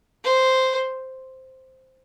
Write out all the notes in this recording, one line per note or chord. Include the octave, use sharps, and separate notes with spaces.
C5